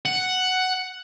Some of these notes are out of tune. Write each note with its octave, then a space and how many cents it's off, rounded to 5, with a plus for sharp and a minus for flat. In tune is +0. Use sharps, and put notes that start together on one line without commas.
F#5 +5